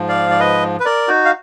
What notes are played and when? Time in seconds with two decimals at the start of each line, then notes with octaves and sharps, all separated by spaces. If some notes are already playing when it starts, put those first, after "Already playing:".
Already playing: G#2 F3
0.09 D5 F5
0.30 D5
0.40 B4 D#5
0.80 B4
0.85 A#4 D5
1.08 D#4 F#4
1.25 F5